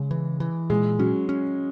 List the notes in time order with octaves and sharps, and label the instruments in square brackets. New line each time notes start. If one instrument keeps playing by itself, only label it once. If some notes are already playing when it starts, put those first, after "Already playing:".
Already playing: [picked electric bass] C#3 [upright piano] G#3
[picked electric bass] E3
E3
[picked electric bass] A#2 [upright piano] G#3
[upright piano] F#3 [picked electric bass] C#4
[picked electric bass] C#4